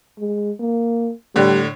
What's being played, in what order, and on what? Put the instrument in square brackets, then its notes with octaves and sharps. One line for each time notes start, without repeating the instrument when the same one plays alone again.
[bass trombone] G#3
A#3
[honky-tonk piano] A2 D3 [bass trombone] G3